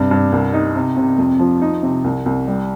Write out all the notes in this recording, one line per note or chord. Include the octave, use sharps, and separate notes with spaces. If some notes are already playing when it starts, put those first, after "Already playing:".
Already playing: G2 C3
G2
C2
D#4
C3
C3
F2
F3
D#4
C3
C2
C2
G3